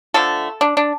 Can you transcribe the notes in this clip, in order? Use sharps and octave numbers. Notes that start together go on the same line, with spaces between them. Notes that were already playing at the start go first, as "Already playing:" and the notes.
D3 F3 A3 A4
D4
D4